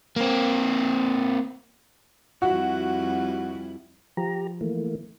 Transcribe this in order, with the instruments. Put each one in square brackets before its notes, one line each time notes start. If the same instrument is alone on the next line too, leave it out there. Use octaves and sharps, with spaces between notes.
[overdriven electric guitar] A#3 C4
[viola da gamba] F2 G3 E4 [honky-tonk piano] F#4
[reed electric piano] F3 [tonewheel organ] G4 A#5
[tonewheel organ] E3 A3 A#3